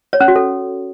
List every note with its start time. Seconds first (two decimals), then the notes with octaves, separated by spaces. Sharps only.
0.13 C#5
0.20 C#4
0.28 F#4
0.36 A4